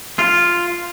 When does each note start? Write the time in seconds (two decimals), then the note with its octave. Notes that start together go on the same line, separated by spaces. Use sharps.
0.19 F4